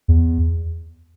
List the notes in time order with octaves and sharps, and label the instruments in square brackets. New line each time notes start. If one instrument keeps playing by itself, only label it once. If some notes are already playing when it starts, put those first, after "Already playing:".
[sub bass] E2